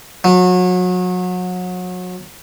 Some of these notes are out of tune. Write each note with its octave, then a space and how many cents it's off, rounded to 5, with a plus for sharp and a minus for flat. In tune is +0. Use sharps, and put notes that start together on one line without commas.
F#3 -30